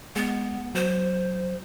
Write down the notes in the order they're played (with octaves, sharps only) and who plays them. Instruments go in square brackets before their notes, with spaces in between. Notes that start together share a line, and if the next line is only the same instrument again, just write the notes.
[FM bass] G#3 [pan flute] B3
[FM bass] F#3 [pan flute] C5